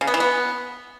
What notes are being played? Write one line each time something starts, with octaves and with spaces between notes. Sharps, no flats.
C#3
B3
E3
B3